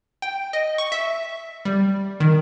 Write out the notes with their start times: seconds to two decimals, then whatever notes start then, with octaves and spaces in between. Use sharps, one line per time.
0.22 G5
0.53 D#5
0.78 C#6
0.92 E5
1.65 G3
2.20 D#3